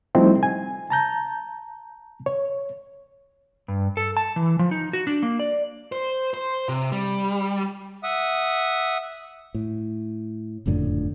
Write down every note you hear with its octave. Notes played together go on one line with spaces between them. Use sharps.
F3 G3 A3 C4 D#4 E4
G#5
A5 A#5 G6
C#5
G2
A4
A5
E3
F3
D#4
F#4
D4
A#3
D5
C5
C5
C3
G3
E5 F#5 D#6
A2
F#1 F2 A2 D3